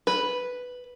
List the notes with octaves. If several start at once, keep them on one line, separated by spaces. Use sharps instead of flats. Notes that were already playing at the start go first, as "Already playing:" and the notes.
B4